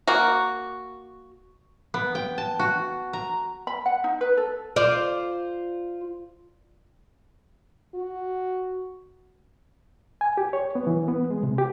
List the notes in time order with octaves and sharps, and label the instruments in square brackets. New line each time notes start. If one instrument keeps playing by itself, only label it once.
[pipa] A#3 F#4
[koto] B3
G5
A5
F#4
A#5
[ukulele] B5
F#5
D#4
B4
A4
[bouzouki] F4 C5 [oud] D5
[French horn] F#4
[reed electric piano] G#5
G4
C#5
B3
E3
B3
G#3
C3
G4